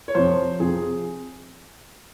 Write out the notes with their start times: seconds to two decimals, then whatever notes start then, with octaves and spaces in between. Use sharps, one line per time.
0.08 C#5
0.15 F2 C3 F3 C5
0.60 F2 C3 F3 G#4